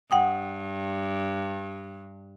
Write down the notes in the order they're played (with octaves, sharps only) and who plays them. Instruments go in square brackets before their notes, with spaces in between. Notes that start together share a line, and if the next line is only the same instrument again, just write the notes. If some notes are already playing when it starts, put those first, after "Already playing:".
[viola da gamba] G2 [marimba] F#5 G5 D#6